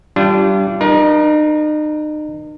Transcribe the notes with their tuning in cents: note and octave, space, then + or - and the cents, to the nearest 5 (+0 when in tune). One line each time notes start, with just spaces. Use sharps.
G3 -20 D4 -15 F4 -40
D#4 -40 A#4 +30